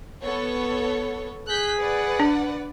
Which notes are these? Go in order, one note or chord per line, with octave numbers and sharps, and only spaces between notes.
B3 A4 C#5
G#4 F#6 G6 B6
B4 D5 F#5
D4